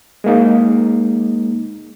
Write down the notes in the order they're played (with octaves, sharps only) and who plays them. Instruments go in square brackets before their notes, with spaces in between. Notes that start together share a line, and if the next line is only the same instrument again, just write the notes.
[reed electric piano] G#3 A#3 D#4